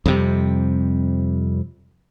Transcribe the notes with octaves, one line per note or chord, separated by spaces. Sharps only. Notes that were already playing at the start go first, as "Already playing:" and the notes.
F2 C3 G3